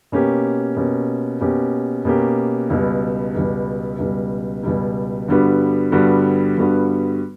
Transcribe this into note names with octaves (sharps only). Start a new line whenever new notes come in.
B2 A#3 C#4 G4
B2 A#3 C#4 G4
B2 A#3 C#4 G4
B2 A#3 C#4 G4
C#2 B2 G3
C#2 B2 G3
C#2 B2 G3
C#2 B2 G3
G2 D3 G3 B3 F#4
G2 D3 G3 B3 F#4
G2 D3 G3 B3 F#4